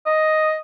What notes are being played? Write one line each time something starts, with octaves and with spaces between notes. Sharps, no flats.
D#5